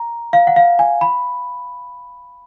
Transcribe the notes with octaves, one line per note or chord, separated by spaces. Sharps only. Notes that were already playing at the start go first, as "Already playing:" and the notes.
Already playing: A#5
F5
F#5
F5
G#5
B5